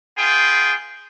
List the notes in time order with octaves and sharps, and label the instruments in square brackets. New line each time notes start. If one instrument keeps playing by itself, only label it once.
[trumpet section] B3 F4 G#4 G5